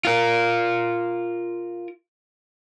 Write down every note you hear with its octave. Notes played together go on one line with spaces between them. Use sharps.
F4 A#4